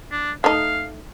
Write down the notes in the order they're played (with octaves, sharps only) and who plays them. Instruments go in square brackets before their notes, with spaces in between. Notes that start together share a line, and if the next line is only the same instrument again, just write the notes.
[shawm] D4
[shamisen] A3 D#4 [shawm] F5